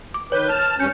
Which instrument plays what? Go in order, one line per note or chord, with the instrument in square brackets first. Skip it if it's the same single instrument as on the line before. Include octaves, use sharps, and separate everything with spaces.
[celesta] D6
[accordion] D#3 B4 G6 [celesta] C#5
[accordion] A5 F6
[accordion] G2 C#4 [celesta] G6 C#7